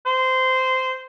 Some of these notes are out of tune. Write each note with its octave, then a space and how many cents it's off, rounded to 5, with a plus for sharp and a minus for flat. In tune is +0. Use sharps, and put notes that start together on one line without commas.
C5 -15